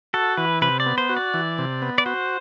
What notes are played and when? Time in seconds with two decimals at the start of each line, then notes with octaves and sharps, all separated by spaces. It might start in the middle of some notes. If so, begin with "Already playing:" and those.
0.14 F#4 A4
0.37 E3 B4
0.61 C3 B4
0.80 D5
0.86 B3
0.98 C5
1.09 F#4
1.17 D5
1.34 E3
1.58 C3
1.82 B3
1.98 D5
2.06 F#4 C5